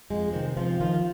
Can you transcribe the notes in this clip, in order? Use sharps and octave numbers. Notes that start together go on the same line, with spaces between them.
F2 G#3
C3 D#3 C4
C3 F3 F4
D#3 F3 F4